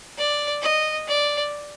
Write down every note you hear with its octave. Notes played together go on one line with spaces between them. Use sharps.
D5
D#5
D5